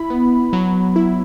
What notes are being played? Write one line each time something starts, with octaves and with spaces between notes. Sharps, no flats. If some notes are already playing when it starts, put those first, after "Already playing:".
Already playing: E4 B5
B3
F#3
E4